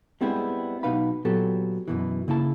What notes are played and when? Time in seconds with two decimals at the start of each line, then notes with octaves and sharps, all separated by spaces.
0.21 G3 G#3 B3 C4 E4 G#4
0.83 B1 B2 D#4 B4 F5 B5
1.25 A#2 F#3 B3 G4 A4
1.88 F#2 B2 E3
2.28 C#3 A#3 E4 A5